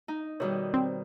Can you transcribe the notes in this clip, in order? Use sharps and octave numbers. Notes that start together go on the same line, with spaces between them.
D#4
B2 D#3 G3 G#4 A#4 C#5
C4